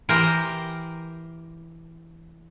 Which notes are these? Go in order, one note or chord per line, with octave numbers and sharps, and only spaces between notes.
E3 G4 A#4 C5 G5 A#5